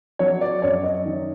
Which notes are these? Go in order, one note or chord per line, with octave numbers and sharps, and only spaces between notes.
F#3 C#5
D5
F#2 C#5
D#5
D#3